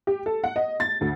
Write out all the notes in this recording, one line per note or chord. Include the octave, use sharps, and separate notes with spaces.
G4
A4
F#5
D#5
A6
D2